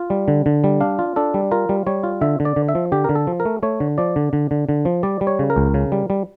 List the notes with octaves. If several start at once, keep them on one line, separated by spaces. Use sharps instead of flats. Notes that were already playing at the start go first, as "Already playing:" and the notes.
Already playing: F4
G3
D3
D3
G3
D4 F5
F4
D4 A4
G3
F4 A#4
G3
G3 C#5
F4
D3 E5
D3
D5
D3
E5
F3
D3 G4
D3 A#4
A4
F3
A#4
A3
A3 C#5
D3
F3 D5
D3
D3
D3
D3
F3
G3 D5
G3
C#5
C#3
A#4
C#2
C#3
G3
G3